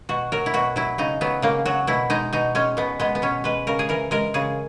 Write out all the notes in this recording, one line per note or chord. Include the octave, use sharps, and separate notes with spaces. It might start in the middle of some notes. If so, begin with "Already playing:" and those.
B2 F#4
F#3 A#4
E4
B2 F#4
F#3 E4
C#3 D#4
F#3 B3
C#3 A#3
F#3 F#4
B2 E4
G#3 D#4
B2 D#4
G#3 C#4
B2 B3
G#3 B3
B3
B2 C#4
G#3 B4
C#3 A#4
G#4
E3 A#4
G#3 A#4
C#3 G#4